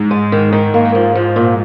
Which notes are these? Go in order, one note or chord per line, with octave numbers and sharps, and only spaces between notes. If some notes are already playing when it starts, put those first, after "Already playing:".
Already playing: G#2
G#3
D#3
D#3
G#2 A#3
F3
F3
A#2